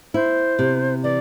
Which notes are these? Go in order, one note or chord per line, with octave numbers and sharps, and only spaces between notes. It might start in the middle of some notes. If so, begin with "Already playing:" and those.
E4 C5
C3
E3 D5